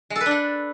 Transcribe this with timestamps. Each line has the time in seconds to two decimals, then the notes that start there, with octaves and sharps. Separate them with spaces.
0.10 G#3
0.16 A4
0.21 B4
0.26 D4
0.31 A4